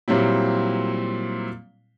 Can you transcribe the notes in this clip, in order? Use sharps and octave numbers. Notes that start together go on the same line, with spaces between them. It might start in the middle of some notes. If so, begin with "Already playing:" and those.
A#2 F#3 G3 C4 E4